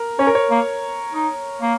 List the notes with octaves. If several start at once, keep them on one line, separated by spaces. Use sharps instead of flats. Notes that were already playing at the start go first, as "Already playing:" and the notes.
Already playing: A#4
C#4 C#5
A#4
C#5
A#3
D#4
A#3